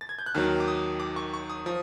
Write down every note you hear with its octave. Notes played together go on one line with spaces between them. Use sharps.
A6
G#6
G6
F#6
D#2 D#3 F#3 F6
D6
D#6
D6
C#6
C#6
D#6
F3 D#6